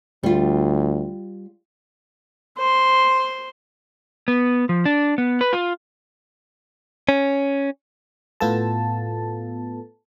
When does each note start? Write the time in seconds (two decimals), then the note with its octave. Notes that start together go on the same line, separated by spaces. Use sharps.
0.23 D2 G3 F4
2.57 C5 C6
4.28 B3
4.69 F3
4.86 D4
5.18 B3
5.41 B4
5.53 F4
7.09 C#4
8.40 A2 B3 F4 A4 A5